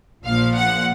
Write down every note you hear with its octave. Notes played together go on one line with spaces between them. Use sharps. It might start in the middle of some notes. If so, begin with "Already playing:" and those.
A#1 A#2 F3 F5
F#5